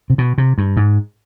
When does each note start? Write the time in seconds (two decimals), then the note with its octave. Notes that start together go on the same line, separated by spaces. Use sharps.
0.10 C3
0.18 B2
0.38 C3
0.58 G2
0.77 G#2